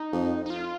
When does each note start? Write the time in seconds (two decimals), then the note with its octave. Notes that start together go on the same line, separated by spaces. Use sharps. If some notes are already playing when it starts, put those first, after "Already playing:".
Already playing: D#4
0.12 F2
0.46 D#4
0.50 F4